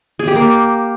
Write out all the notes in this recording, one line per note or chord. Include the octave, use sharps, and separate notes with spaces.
G#4
G4
A#3